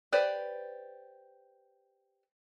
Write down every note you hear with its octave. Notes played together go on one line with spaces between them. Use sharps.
G4 B4 C5 D5